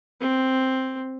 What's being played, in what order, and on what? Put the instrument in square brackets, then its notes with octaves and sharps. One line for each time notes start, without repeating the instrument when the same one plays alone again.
[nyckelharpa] C4